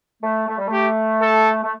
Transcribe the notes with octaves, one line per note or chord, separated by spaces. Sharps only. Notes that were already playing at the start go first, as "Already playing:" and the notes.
A3
A3
G3
A3 G4
A4
A3